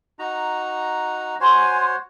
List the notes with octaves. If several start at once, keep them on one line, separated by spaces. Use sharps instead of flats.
D#4 F#4 A#5
F#4 C5 C#5 G#5 C6